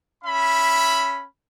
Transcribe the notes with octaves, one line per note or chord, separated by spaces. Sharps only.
C#4 E5 B5